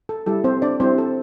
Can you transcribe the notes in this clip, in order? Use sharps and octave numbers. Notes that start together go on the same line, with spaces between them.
A4
G3 E4 G4 A4
C4 C5
D4 D5
G3 C4 E4 G4 C5
A4